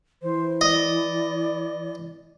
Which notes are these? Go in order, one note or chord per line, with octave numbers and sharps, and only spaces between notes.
E3 C5
D5 D#5